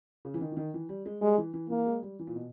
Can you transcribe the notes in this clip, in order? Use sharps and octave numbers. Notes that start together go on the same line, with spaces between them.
C#3
E3
D#3
E3
D#3
E3
G3
G#3
G3 G#3
E3
E3
E3 A#3
G#3
G3
E3
A#2
B2